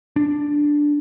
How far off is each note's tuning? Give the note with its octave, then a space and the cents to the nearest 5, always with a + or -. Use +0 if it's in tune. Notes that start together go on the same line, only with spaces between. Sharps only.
D4 +0